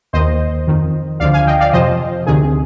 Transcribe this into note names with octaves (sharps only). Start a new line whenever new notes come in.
D#2 D#3 C5 D#5
F2 D#3
D2 D3 F3 D5 F5
F5 G#5
D#5 G5
D5 F5
F2 C3 F3 C5 D#5
D2 C3 D#3 G#4